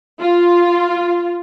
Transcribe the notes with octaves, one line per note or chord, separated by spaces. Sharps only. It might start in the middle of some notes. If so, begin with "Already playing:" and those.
F4